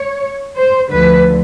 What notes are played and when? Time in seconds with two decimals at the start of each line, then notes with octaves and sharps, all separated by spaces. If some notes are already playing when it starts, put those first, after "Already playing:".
Already playing: C#5
0.57 C5
0.90 D2 D3 F3 B4